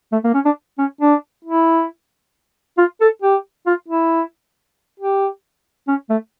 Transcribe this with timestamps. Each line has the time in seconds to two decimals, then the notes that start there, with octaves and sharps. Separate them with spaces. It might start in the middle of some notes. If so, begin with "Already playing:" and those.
0.12 A3
0.24 A#3
0.34 C#4
0.45 D4
0.78 C#4
1.01 D4
1.45 E4
2.78 F4
3.01 A4
3.22 G4
3.66 F4
3.88 E4
5.00 G4
5.88 C#4
6.10 A3